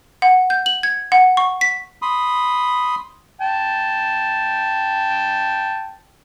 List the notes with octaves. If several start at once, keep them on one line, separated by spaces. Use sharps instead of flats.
F#5
G6
F#7
G#6
F#5
C#6
B6
B5 C6 D#6
G5 A5